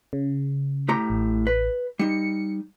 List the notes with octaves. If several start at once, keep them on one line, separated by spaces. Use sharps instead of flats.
C#3
A2 G4 A#5
A1
B4
G3 D#4 C#7